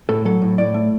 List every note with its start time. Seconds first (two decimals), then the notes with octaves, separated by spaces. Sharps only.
0.09 A2 A4
0.25 F#3 A4
0.42 A2
0.58 A2 D5
0.74 A3